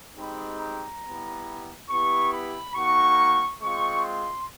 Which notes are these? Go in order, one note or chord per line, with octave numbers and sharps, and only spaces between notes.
G#3 C4 D#4 G4 B5
A#5
G3 B3 E4
B3 E4 G4 C#6
B5
A#3 D#4 F#4 C#6
G#3 C4 F4 C#6
C6